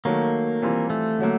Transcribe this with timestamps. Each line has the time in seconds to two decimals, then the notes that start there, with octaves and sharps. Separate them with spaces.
0.05 D#3 F#3 A3 A#3
0.62 E3 G3 C4 F4
0.90 A3
1.19 D3 F#3 A#3